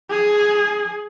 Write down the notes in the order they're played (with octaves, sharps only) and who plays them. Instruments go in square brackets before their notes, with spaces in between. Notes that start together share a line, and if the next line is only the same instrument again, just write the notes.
[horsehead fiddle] G#4